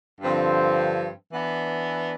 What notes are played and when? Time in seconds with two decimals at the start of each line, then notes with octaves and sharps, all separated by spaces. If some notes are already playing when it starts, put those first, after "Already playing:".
0.20 G2 D3 F3 C4
1.32 E3 B3 D4